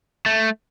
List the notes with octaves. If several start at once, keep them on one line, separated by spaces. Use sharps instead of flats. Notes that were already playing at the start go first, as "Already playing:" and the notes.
A3